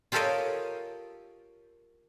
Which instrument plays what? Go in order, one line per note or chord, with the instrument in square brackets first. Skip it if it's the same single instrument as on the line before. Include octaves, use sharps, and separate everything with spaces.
[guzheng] F4 G4 A4 A#4 C#5 D#5